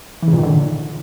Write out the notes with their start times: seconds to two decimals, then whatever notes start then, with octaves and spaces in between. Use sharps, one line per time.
0.22 E3
0.28 C#3
0.33 A#2
0.38 D#3
0.43 D3